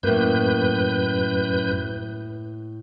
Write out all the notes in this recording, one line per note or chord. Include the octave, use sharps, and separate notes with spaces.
F#2 A2 A#3 B4 G6